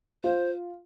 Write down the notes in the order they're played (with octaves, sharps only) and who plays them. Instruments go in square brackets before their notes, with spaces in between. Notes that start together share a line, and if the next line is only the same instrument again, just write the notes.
[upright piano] F4 [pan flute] C5